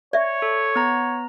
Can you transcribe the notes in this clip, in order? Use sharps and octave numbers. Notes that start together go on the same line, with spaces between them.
C#5 D5 E5
A4
B3 A#5